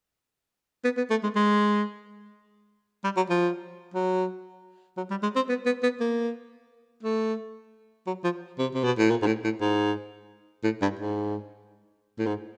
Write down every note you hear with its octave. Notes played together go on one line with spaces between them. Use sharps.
B3
B3
A3
G#3
G#3
G3
F#3
F3
F#3
F#3
G3
G#3
C4
B3
B3
B3
A#3
A3
F#3
F3
C3
C3
B2
A2
A#2
G#2
A2
A2
G#2
A2
G2
G#2
A2
G#2